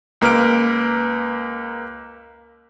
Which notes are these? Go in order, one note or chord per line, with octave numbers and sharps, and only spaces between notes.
C#2 A#3 B4 F6 D7